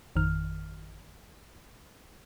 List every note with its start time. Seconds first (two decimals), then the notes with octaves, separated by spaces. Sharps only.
0.16 G#1 F2 D#3 F6